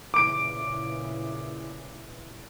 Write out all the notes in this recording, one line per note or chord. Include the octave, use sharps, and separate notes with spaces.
A#2 C#3 E3 D6 D7